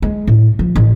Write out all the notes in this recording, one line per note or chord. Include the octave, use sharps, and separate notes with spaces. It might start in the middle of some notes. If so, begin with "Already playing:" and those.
G#3
A2
F3
A1